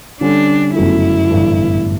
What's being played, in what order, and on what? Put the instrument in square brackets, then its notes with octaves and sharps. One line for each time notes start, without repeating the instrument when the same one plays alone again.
[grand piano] D3 G3 C#4 [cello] D4
[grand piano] G1 F#2 C#3 F#3 A3 [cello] E4
[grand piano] A1 G2 D3 A3